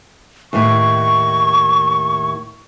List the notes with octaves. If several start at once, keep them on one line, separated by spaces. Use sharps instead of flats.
D#2 A2 C#6